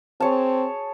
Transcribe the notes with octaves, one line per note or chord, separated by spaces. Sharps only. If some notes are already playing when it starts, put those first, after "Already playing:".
C4 G#4 C#5 A5